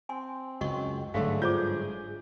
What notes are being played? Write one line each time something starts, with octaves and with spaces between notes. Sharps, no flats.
C4 G#5 C6
C#2 F#2 F#4 D#5 C#6
G1 G#2 D3 F#3 A3 G#4 F5
F4 C5 D5 D6 G6